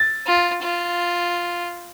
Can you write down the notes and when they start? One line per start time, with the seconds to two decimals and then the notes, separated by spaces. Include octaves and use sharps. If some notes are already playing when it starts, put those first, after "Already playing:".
Already playing: A6
0.26 F4
0.63 F4